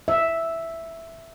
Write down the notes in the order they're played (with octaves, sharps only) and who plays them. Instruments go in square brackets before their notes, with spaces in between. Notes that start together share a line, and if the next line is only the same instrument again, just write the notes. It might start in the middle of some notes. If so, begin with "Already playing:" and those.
[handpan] E5